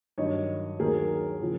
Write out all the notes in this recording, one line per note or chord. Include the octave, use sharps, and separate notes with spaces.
G2 D#3 F#3 C#5 D#5
D#2 D#3 F#3 G#4 A#4
C#3 F3